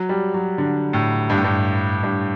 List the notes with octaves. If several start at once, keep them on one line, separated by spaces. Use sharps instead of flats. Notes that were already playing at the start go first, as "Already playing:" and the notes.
Already playing: F#3
G3
F#3
D3
A2
G2
A2
G2
G2